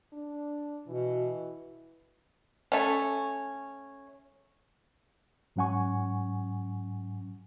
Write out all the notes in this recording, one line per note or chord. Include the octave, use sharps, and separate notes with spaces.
D4
B2 E3
A3 C#4
G#2 F#3 C#4 F#5 G#5 C#6